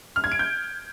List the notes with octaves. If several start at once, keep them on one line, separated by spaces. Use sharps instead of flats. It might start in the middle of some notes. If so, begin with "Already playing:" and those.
F6
G#6
D7
G6